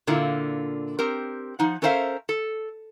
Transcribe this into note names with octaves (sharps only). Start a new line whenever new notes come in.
A#2 D3 A#3 E4 F4
C4 G4 A#4
F3 D#4 F#5
C#4 A4 A#4 C5 E5 F5
A4